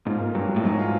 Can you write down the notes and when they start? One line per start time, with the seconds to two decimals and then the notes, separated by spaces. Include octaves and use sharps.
0.06 G#2 F4
0.20 A#3
0.35 G2 F#3
0.49 F#3
0.56 A2
0.64 G#2 F#3
0.79 F4